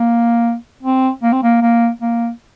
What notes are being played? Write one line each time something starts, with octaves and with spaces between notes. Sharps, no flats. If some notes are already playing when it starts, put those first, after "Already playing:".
Already playing: A#3
C4
A#3
C4
A#3
A#3
A#3